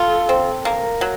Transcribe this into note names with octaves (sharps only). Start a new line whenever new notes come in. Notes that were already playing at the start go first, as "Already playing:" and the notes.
Already playing: F4 A4
C4
A#3 A#4
F#3